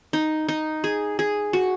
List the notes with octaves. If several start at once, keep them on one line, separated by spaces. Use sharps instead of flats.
D#4
D#4
G#4
G#4
F#4